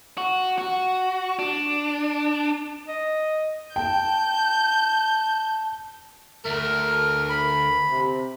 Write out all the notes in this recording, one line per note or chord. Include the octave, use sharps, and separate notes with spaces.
F#4
F#4
D4
D#5
G5 A5 G6
D2 A3 A#4
B5
C3